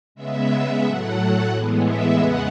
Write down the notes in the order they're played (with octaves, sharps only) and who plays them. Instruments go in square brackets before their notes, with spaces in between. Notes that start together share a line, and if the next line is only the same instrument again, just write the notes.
[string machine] C#3 G#3 B3 E5
A2 F#3 A3 F#5
A2 E3 G#3 B3
E5
E2 C#3 G#3 B3 F#5